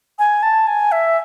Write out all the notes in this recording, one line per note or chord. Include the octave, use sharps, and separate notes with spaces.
G#5
A5
G#5
E5